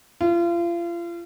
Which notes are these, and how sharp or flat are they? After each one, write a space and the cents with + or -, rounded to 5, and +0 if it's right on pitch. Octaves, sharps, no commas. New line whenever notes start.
F4 -35